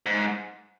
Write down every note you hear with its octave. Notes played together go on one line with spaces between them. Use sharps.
G#2